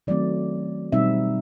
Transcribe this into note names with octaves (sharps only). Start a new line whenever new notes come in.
D#3 F#3 A3 C4 D5
B2 G3 C4 D#4 E5